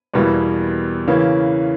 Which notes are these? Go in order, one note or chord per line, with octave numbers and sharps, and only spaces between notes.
E2 B2 G3 A#3 E4
C#3 E3 A#3 C#4